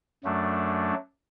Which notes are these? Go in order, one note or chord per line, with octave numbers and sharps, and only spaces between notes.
F#2 F#3 A3 D4